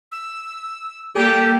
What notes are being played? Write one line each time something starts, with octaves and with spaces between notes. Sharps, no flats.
E6
G3 A#3 G4 A4